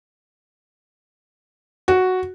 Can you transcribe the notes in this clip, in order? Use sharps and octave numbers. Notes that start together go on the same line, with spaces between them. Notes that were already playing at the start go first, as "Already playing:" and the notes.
F#4